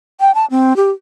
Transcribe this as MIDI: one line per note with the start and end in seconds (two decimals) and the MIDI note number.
0.20 0.33 79
0.35 0.45 81
0.50 0.76 60
0.76 0.91 67